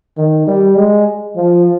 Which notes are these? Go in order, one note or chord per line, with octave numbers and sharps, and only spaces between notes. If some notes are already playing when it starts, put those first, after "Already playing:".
D#3
G3
G#3
F3